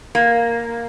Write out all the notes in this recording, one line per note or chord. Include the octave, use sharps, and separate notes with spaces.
A#3